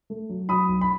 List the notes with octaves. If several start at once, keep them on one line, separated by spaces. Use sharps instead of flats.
A3
F#3
F#3 B5 D#6
B1
B5